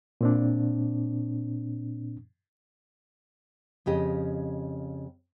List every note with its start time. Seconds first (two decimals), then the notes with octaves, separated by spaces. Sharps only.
0.21 A#2 C4 D4
3.86 F2 C#3 G4 D#5